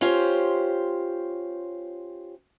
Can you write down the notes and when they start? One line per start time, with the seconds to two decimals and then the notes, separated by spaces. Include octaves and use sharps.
0.01 C#4 F4 G4 C5